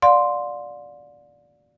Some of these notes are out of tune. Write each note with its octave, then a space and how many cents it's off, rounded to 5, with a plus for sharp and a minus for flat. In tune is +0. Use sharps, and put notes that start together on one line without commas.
D5 +0 F5 +40 C6 +0